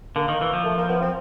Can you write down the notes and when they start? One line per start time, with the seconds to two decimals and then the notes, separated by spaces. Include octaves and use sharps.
0.16 D3 A#3
0.28 D#3
0.41 E3
0.53 F3
0.65 A3
0.78 A#3
0.89 B3
1.02 C4